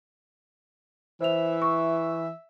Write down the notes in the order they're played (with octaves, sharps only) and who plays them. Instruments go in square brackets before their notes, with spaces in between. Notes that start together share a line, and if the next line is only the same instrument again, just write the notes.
[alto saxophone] E3 [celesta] C5 F7 [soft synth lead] E5
[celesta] C#6